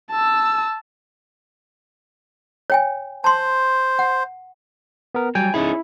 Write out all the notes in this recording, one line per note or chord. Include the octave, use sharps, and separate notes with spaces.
A5 E6
C#5 G5 G#5
C5 A5 C6
F#5
B3 A#4
F#3 G3 G5 G#5
C#4 D#4 E4 G#4